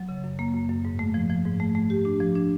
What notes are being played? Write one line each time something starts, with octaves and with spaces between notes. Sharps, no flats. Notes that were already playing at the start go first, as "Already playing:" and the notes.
Already playing: F#3
C#3
F#2
A#3
F#2
F#2
G#2
A3
F3
F3
G#2
A3
A3
G4
D4
F3
D4